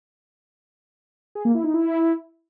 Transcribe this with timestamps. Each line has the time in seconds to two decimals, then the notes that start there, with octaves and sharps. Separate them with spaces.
1.35 G#4
1.45 A#3
1.55 E4
1.64 D#4
1.74 E4